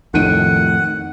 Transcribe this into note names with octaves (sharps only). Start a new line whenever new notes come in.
F2 A2 D#3 F#5 D7 D#7